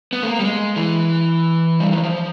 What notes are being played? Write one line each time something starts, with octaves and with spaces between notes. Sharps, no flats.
B3
A3
A#3
G3
G#3
E3
G3
F#3
F3